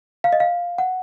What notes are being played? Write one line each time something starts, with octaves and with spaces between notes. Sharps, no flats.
F5
D#5
F5
F#5